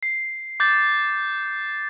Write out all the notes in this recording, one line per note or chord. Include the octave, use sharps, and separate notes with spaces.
C7
D6 G6 A6